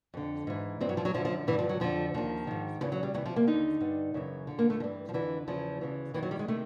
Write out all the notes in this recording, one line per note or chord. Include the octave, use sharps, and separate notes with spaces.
F2 D3
G#2 E3
G2 E3 C4
F#3
F3
F#3
F#2 D3 F3
F3
G2 D3 E3
F3
F#3
F2 D3 F3
D#2 D#3 F3
G#2 D#3
E2 C#3 E3 F3
F#3
G3
D2 C3 E3 F#3
F3
A#3
D#2 D3 D#4
G2 D3
F#2 C#3 E3
F2 D3
A#3
A3
G2 E3 F3
F3
F2 D3 E3
E2 C#3 E3 F3
D2 C#3 E3
F#2 D#3 E3
F#3
G3
G#3
C3 D#3 A3